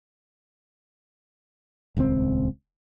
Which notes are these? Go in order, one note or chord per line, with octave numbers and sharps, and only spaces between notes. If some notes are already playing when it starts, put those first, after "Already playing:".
D#1 C#2 C#3 C4